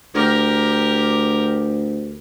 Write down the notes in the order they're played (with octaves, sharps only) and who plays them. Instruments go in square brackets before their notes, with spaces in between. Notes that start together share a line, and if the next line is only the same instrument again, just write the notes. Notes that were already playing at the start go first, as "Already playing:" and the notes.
[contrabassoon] D2 [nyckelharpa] G4 A#4